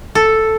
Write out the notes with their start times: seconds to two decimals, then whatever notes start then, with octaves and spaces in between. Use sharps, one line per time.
0.15 A4